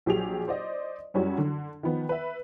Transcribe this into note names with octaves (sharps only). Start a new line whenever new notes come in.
A#1 F#3 G4 G#4 F7
C5 D5 D#5
F#2 G3 C#4 E4 F#4
D3
D#3 F3 B3
B4 E5